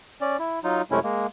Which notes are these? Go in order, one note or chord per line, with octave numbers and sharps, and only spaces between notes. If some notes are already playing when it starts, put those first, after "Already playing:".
C#4 D5
E4
F#3 D#4 F4
F#2 C3 G#3 A3 C#4 E4
G#3 A#3